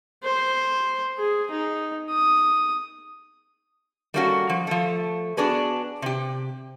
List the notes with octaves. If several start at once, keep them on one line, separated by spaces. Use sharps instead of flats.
C5
G#4
D#4
D#6
G3 A3 A#3 C#4 D#4 F#4
F3
F3 A3
B3 D4 F#4 G#4 B4
C3 G4